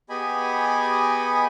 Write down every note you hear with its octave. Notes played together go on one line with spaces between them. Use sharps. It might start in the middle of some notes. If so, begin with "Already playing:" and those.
B3 G4 G#4 D#5 G#5 B5